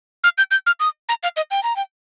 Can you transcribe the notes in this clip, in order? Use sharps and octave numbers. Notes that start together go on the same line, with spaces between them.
F6
G6
G6
F6
D#6
A#5
F5
D#5
G5
A#5
G5